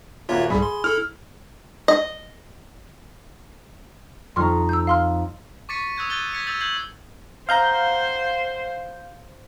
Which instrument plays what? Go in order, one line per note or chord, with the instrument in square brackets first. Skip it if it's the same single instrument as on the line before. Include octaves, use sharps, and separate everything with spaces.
[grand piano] D#1 A#3 F#4 [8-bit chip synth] F4 C#5 E5
[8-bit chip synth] C2 G#2 G3 [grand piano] G#4 B5
[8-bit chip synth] C6
[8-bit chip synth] E4 A4 [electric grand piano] F6
[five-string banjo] D#5
[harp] F2 D#4 A#5 [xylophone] C6 C#6 F6
[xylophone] E6 G6
F5 C6 F6
[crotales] C#6 D6 A6 B6 C#7 D#7
D#6 E6 F#6 G#6 D#7
F#6 G6 A6 D#7 G7
G#6 B6 C#7 D#7
E6 G6 A6 F7
G6 G#6 C7 F#7
[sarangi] C5 [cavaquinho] D#5 F#5 A#5 [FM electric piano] F5 G6